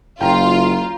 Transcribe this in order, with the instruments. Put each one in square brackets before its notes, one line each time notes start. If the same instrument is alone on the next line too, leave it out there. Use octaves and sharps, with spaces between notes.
[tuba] F#1 [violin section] F4 [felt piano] G5 A#5